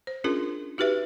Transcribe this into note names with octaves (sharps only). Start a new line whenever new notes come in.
C5
C#4 D4 F4 G#4 A#4
D#4 F#4 G4 B4 E5